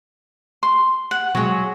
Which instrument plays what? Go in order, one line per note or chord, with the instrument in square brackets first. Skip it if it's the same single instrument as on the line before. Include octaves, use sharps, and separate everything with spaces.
[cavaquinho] C6
F#5
[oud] F#3 G#3 [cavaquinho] C#5